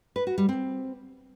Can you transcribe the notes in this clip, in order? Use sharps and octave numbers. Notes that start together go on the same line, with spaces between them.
B4
F#4
G3
C4